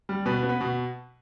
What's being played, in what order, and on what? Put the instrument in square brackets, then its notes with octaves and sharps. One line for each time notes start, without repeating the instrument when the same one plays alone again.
[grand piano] G3
B2 B4
B3
B4
B2